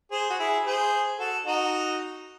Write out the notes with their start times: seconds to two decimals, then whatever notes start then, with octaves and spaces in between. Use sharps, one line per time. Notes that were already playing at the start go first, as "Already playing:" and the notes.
0.11 G#4 C5
0.30 F#4
0.39 E4 G#4
0.66 G#4 C5
1.19 F#4 A4
1.46 D#4 F#4